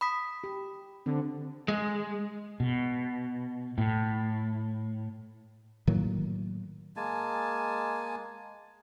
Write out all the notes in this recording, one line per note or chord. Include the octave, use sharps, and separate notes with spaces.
B5 D#6 B6
G4
D3 C4
G#3
B2
A2
A2 D#3 F#3 A#3
G#3 A#3 G#5 A5